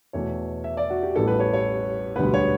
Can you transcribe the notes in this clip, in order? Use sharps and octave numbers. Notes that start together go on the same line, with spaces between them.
E2 B2 A3 C#5
E5
D5
F#4
G4
A1 A2 G3 B3 A4
B4
C#5
C#5
E1 D2 D3 G3 B3 B4
C#5